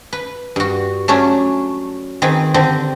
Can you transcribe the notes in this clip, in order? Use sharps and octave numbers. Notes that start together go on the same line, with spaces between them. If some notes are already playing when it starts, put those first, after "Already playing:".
B4
G2 F#4
F#3 A3 C#4 D4
D#3 C4 G#4 B4 G#5
D3 C4 G4